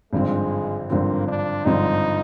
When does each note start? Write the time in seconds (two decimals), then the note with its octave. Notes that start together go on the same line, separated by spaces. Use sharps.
0.12 G#1 G2 D3 F3 G#3 C4
0.90 G#1 G2 D3 F3 A#3 C4
1.28 D4
1.66 G#1 G2 D3 F3 C4 D#4